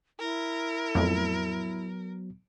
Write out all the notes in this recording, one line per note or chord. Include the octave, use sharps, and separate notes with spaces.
E4 A#4
F2 A2 F#3 B3